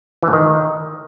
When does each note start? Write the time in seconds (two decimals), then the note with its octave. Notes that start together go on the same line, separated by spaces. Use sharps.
0.23 E3
0.28 A2
0.33 D#3